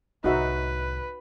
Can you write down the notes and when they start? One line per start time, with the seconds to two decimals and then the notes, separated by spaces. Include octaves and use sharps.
0.24 C2 A2 D#4 F#4 B4 E5